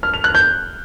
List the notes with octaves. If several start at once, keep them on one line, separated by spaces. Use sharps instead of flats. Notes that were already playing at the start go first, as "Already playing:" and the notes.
F6
F7
F#6
G6